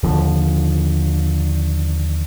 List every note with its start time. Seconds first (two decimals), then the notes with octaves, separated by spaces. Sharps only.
0.03 D#2 D3 F3